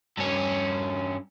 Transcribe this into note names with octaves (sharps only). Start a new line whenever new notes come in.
G2 C#4